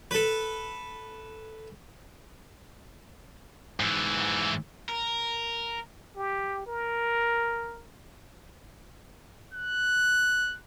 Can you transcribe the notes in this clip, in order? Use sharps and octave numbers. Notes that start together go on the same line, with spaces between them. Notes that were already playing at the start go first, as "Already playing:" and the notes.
A4 B4
G#2 E3
A#4
G4
A#4
F#6